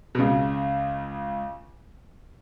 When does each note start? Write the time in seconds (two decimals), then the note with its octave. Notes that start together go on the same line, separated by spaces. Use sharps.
0.15 B2
0.19 C#2 C#3